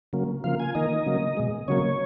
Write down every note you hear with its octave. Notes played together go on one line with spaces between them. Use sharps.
C#3 F#3 A#3
C#3 F3 A#3 F5
G#5
D#3 A#3 D#5
C#3 F#3 A#3
B2 G#3
C#3 F#3 A#3 C#5